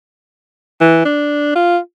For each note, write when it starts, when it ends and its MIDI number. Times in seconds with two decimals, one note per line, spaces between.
0.81 1.00 52
1.05 1.53 62
1.56 1.78 65